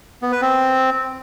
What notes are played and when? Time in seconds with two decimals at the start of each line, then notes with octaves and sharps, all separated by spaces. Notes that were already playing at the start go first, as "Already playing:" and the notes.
0.22 B3
0.32 B4
0.42 C4